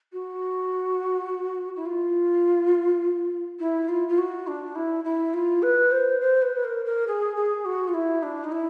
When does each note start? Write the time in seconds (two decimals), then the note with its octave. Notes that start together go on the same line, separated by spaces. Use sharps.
0.12 F#4
1.76 E4
1.85 F4
3.59 E4
3.88 F4
4.08 F4
4.18 F#4
4.47 D4
4.75 E4
5.04 E4
5.33 F4
5.62 B4
5.91 C5
6.20 C5
6.42 B4
6.55 B4
6.64 A#4
6.85 A#4
7.07 G#4
7.36 G#4
7.65 F#4
7.88 F4
7.94 E4
8.22 D4
8.44 D#4
8.51 E4